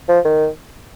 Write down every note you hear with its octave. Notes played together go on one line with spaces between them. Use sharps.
F3
D#3